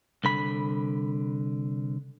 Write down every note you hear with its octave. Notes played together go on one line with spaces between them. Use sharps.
C2 D3 B5